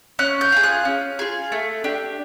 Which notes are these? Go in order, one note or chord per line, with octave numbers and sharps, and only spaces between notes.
C#4 F#6
G6
F4 G#4
F#6
C#4
F4 G#4
A3
D4 G4